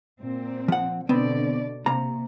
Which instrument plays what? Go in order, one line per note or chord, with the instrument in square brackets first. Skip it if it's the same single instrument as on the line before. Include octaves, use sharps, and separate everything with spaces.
[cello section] A#2 C4
[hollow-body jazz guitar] F3 F#5
[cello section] B2 D3 D5 [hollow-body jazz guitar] B3 C4
[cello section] C3 [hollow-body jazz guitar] A#3 A#5